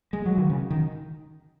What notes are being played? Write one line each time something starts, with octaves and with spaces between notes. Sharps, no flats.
G#3
F#3
D#3
C#3
D#3